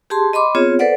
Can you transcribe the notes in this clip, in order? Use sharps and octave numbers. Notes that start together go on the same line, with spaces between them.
G4 G#4 A5 C6
D#5 B5 C6 D6
B3 C4 F4 G#4 C#5
A4 B4 C5 D5 F#5